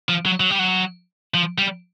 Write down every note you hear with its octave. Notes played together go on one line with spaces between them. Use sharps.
F3
F#3
F#3
G3
F#3
F3
G3